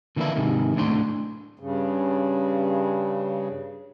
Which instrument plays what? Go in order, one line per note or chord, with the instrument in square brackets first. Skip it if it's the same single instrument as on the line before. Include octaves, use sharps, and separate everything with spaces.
[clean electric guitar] D3 E3 A#3 C4 D4 E4
G#2 C3 D#3
A2 A3 D4 C6
[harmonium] G2 C#3